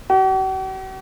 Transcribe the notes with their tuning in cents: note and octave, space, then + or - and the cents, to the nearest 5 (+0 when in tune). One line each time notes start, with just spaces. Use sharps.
F#4 +45